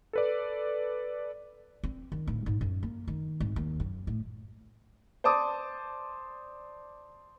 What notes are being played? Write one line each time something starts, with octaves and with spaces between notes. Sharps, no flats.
A4 B4 D5
C4
D#3
D1
G#2
F#2
A#3
D#3
G#1
D#2
F#2
A2
C5 D5 A5 D6 D#6